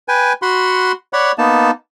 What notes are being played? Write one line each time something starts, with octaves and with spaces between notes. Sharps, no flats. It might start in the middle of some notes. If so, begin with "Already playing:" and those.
B4 G5 G#5
F#4 F#5 B5 C6
C#5 D5 F#5 B5
A#3 B3 D#4 A5